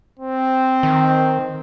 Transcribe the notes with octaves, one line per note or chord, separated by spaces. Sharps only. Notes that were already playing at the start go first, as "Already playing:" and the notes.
C4
D#3